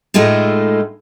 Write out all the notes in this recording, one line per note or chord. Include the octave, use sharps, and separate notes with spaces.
A2 G#3 A3 D#4 F4